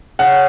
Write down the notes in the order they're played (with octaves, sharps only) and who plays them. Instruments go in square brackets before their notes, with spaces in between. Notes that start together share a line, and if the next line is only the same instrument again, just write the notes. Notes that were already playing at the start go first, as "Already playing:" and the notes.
[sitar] C#3 [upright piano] F#5